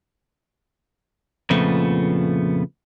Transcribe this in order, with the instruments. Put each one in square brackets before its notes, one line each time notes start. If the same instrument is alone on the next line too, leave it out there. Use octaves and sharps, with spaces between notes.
[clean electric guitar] F2 A#2 C#3 F3 A3 B3